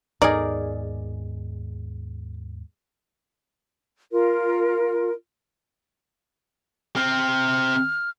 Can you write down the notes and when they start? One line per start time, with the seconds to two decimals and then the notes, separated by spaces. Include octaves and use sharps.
0.22 D#2 G#2 B3 D#4 G#4 A#4 D5
4.12 F4 A#4
6.96 C3 C4 F6